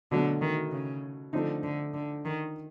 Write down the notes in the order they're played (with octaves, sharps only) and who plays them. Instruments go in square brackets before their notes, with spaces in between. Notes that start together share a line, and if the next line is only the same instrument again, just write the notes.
[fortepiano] B2 F#3 A3 [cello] D3
[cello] D#3
C#3
[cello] D3 [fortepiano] F3 A3 C4 D#4
[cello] D3
D3
D#3